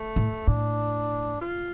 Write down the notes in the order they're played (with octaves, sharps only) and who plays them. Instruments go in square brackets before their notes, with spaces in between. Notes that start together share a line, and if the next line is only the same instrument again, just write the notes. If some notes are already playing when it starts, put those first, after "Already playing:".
Already playing: [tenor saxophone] A3
[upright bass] A2
[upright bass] A2 [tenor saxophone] D4
[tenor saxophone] F4